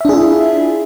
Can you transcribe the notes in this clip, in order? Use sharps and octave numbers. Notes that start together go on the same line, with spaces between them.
D4 E4 F4 G#4 E5